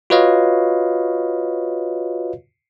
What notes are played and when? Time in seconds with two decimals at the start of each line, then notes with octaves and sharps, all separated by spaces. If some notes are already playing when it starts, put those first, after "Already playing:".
0.10 F4 F#4 B4 C#5 D#5 F5